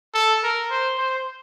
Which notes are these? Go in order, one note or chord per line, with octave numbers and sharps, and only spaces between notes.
A4
A#4
C5
C5